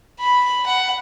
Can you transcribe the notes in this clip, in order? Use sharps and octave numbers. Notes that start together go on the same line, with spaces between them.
B5
F#5